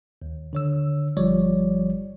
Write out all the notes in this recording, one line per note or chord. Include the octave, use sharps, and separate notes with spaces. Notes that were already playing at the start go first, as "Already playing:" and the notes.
D#2
D3 C#5 E6
G1 F3 G3 C#5 D5